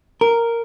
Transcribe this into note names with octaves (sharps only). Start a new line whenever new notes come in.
A#4